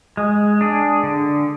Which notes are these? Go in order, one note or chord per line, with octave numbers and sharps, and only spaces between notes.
G#3
D4 G#4
D3